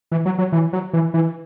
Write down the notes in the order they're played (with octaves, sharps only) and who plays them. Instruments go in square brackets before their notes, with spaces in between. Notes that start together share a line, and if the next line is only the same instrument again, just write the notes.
[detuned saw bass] E3
F#3
F#3
E3
F#3
E3
E3